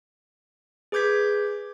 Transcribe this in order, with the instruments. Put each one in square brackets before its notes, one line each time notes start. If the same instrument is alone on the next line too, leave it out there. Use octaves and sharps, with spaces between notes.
[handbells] G#4 B4 D6 G6 G#6 B6